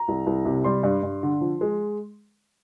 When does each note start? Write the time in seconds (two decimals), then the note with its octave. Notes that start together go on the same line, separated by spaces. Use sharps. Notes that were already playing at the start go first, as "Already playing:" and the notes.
Already playing: A#5
0.08 C2
0.26 C2
0.45 C3
0.64 G3 C6
0.83 G2
1.03 G2
1.23 D3
1.41 F3
1.61 G#3